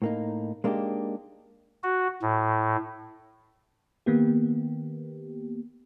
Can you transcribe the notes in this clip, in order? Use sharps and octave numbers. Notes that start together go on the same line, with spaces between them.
A2 A#3 D#4
G#3 A#3 D4 D#4 G4
F#4
A2
D#3 A#3 B3 G4